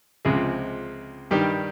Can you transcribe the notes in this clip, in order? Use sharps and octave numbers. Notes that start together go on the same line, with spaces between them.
C#2 C3 F3 G#3 G#4
G2 D#3 G3 G4